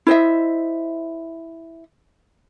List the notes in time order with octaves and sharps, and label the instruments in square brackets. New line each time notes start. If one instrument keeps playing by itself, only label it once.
[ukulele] E4 C5 D#5 E5